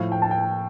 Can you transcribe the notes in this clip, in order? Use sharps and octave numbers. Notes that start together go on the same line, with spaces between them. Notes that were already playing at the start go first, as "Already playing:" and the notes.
Already playing: A2 F3 F5
G5
A5
G5